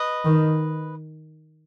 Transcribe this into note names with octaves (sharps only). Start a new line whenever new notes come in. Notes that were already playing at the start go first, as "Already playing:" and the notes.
Already playing: B4 D#5
D#3